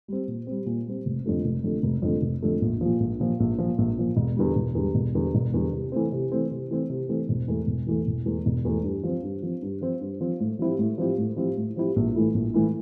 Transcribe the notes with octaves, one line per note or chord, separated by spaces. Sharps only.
G3 C4
A#2
G3 C4
A#2
G3 C4
F1
F2 D3 A3
F1
F2 D3 A3
F1
F2 D3 A3
F1
F2 D3 A3
A#1
A#2 F3
A#1
A#2 F3
A#1
A#2 F3
A#1
A#2 F3
E1
E2 D3 G3
E1
E2 D3 G3
E1
E2 D3 G3
E1
E2 D3 G3
C3
E3 A3 C4
C3
E3 A3 C4
C3
E3 A3 C4
C3
E3 A3 C4
E1
E2 E3 A3
E1
E2 E3 A3
E1
E2 E3 A3
E1
E2 E3 A3
G2
F3 C4
G2
F3 C4
G2
F3 C4
G2
F3 C4
A2
F3 C4 E4 G4
A2
F3 C4 E4 G4
A2
F3 C4 E4 G4
A2
F3 C4 E4 G4
A#1
A2 E3 A3 E4
A#1
A2 E3 A3 E4